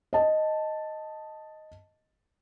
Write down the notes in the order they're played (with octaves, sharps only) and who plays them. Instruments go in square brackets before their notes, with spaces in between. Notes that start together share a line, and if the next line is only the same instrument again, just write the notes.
[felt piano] D#5 A5